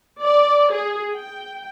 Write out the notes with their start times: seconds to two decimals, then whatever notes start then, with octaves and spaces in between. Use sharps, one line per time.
0.21 D5
0.72 G#4
1.13 G5